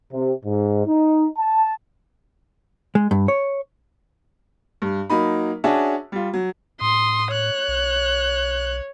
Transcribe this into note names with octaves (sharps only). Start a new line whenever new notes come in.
C3
G#2
D#4
A5
G#3
G2
C#5
G2
F#3 A#3 D#4 B5
C#4 D4 F#4 G#4 E5 A5
G3 F4
F#3
A2 C6 D#6
C#5 F#6
B1